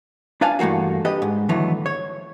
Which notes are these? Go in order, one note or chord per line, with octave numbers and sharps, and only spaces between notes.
D4 B4 D5 F5 G#5 A5
G2 E3 A3 A#3 F#4
D4 G4 B4 D#5
G#2
D#2 D3 E3 F#3 A3 B3
C#5